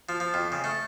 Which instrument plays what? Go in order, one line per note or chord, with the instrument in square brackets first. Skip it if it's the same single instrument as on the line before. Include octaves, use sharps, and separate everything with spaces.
[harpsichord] F3
F3
F2
C#3
A3